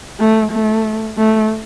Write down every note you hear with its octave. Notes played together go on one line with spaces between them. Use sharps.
A3
A3
A3